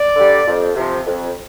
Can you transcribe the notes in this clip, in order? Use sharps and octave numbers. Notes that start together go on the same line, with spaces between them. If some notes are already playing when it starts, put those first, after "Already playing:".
Already playing: D5
D3 G3
F2
C3 F3
F2